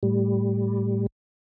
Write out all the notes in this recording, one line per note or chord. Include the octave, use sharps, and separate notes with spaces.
A2 G3